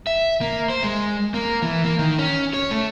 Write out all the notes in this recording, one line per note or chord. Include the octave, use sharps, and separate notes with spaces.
E5
A#3
C5
G#3
A#3
E3
A#3
D#3
C#4
C#5
A3